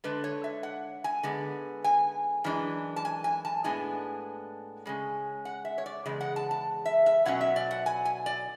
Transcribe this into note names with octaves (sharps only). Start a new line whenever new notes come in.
D3 G#3 D4 B4
C#5
E5
F#5
G#5
D3 G#3 B3
G#5
F#2 E3 G#3 D4
A5
G#5
G#5
A5
A2 G#3 B3 D4 G#5
C#3 G#3 C#4
F#5
E5
C#5
D5
E2 C#3 G#3
F#5
A5
A5
E5
E5
B2 F#3 C#4 F#5
E5
D5
F#5
G#5
G#5
D5